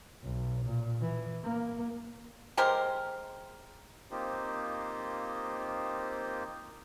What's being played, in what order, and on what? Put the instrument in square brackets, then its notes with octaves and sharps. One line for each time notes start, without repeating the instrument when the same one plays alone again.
[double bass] B1
A#2
E3
A#3
[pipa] G#3 G4 A#4 C5
[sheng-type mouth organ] A#3 C4 D#4 F4 G4 C5